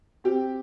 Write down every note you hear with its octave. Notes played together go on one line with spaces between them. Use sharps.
C4 G4